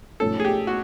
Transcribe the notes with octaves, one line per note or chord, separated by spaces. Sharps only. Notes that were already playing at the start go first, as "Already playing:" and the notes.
G#2 F3 A3 C#4 A4
G#4
G4
F#4